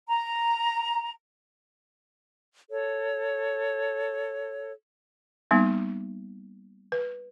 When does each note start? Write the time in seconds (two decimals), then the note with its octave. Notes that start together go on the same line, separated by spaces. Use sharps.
0.09 A#5
2.70 A4 C#5
5.51 G3 A#3 B3 D#4
6.92 B4